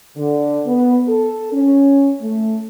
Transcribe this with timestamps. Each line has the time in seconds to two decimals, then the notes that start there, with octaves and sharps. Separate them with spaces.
0.17 D3
0.66 B3
1.08 A4
1.53 C#4
2.21 A3